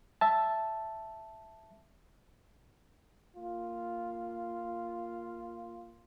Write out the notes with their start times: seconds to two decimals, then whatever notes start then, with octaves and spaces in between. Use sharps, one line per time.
0.21 E5 A5
3.36 A#3 F4